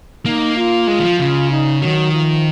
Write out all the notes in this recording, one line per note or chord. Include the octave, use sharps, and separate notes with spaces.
A#3 D#4
F4
G#3
D#3
F3
C#3 F4
D#4
D#3 F#3
F3